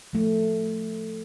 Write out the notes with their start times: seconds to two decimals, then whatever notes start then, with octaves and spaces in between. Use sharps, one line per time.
0.13 F3 A3